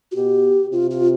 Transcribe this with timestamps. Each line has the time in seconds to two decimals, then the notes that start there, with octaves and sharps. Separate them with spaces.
0.12 F#4
0.16 B2 G4
0.72 C3 F4
0.91 F4